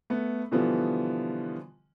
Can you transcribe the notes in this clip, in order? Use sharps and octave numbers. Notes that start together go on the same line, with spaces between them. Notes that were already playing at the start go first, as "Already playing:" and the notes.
A3 B3
B2 D3 E3 F3 G3 B3